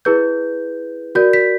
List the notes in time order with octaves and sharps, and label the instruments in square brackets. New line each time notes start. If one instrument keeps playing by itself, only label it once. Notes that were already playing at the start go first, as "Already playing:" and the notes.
[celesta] E4 G#4 B4 G6
F#4 A#4 D5 G6
B6